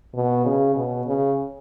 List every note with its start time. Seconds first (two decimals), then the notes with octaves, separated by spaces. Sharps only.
0.14 B2
0.45 C#3
0.76 B2
1.06 C#3